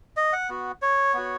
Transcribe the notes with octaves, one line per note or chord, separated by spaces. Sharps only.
D#5
F#5
B3 F#4
C#5
B3 F#4